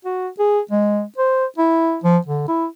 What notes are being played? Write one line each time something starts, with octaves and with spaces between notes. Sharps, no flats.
F#4
G#4
G#3
C5
E4
F3
D3
E4